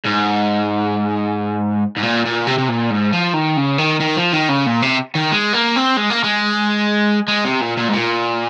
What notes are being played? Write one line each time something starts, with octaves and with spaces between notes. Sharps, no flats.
G#2
G#2
A#2
A#2
C3
C3
A#2
G#2
F3
D#3
C#3
D#3
D#3
F3
D#3
C#3
A#2
C3
D#3
G#3
A#3
C4
G#3
A#3
G#3
G#3
C3
A#2
A#2
G#2
A#2